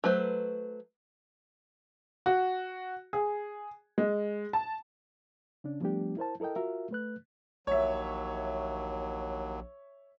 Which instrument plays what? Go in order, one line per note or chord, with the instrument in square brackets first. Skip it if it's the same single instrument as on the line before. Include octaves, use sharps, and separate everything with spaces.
[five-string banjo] F#3 A3 B4 C5
[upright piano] F#4
G#4
G#3
A5
[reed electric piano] C#3 C#4 D4
F3 G3 A3 B3 D4 G4
E4 A#4 C5 A5
E4 A4 A#4 D#5 G5
F4 F#4 A#4 E5
A3 B4 F#6
[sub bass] A#1 [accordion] D#2 F#3 [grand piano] C#5 E5